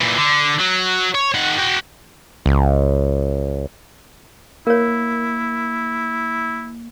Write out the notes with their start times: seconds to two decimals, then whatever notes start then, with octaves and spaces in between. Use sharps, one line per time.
0.01 A#2 E3
0.17 D3
0.60 F#3
1.15 C#5
1.34 D#3 F#5
1.58 F#4 G5
2.46 C#2
4.67 A#3 E4 A#4 C#5